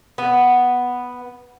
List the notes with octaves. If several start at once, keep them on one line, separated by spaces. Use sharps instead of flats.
B3